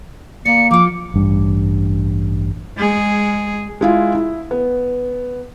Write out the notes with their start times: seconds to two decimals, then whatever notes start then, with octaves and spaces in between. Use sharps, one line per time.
0.45 A#3 D5 C#7
0.71 F3 F4 D6
1.14 A1 G2
2.77 G#3 G#4
3.81 G#3 E4 F4
4.15 E4
4.51 B3